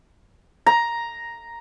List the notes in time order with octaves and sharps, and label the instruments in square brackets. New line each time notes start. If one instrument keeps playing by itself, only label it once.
[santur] A#5